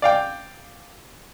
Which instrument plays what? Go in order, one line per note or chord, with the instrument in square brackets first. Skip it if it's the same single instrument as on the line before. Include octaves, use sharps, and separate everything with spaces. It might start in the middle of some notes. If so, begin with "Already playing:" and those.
[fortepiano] D5 F5 G5